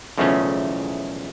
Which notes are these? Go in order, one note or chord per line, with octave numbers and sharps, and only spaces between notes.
B1 E2 C#3 F3 A3 C#4